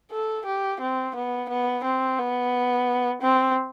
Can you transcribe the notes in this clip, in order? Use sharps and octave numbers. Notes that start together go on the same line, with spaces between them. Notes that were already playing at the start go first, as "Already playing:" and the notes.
A4
G4
C4
B3
B3
C4
B3
C4